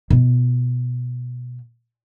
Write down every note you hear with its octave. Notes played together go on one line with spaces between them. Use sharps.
B2 F4